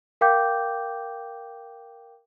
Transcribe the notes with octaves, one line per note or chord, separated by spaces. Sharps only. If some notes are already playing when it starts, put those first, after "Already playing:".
A#4 F5 G5 D6 G6